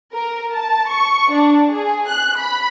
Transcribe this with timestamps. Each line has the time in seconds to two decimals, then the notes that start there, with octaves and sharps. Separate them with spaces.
0.14 A#4
0.52 A5
0.88 C#6
1.33 D4
1.68 G#4
2.09 F#6
2.37 B5